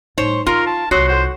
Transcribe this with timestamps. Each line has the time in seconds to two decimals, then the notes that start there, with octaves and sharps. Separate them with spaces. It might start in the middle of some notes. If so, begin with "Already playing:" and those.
0.18 A2 G3 D#4 C5 C#5
0.47 D#4 F4 A#4 C6 C#6
0.66 A5
0.91 C2 F4 F#4 C#5 C6 D#6 E6
1.08 A4 C5 F#5 C6